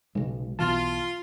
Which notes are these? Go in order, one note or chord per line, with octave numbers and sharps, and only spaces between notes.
B1 C#3 G#3
B1 B2 E3 F4 A5 C6